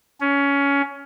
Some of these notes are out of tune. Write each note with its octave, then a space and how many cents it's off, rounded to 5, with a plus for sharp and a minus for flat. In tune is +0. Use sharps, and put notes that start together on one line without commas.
C#4 +20